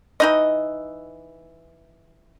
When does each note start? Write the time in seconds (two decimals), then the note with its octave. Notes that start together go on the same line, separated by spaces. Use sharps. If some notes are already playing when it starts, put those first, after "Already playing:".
0.20 E3 D#4 D#5